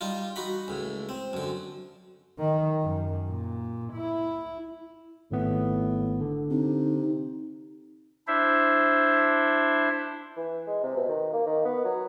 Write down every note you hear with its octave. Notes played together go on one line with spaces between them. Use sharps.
G3 D#4 F4
D#4 F#4 B5
C#2 A2
C4
F#2 D3
D#3
F#2
A#2
E4
G#1 A2 B3
D3
C3 D#4
D4 E4 C5 E5
E3
G#3
C3
B2
D#3
A#3
D#3
B3
F#3